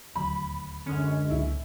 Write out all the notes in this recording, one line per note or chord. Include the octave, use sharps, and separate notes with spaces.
D#1 D2 F#3 B5
F#2 D3 G#3 C#4
C#2 A#2 E4